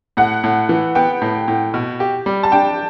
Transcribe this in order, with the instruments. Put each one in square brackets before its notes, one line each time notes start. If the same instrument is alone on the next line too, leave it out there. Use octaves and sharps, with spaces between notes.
[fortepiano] A2 [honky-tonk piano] F#5
[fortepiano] A2
E3
[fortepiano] B3 [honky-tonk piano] G5
[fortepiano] A2
A2
B2
G4
G3
[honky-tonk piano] A5
[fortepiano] D4 [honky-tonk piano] G5